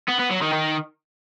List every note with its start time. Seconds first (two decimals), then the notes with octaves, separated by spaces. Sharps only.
0.09 B3
0.20 B3
0.31 F#3
0.42 D#3
0.53 D#3